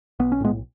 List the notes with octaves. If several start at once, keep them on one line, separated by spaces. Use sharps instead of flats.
B1 B3
C#4
A2 G#3 B3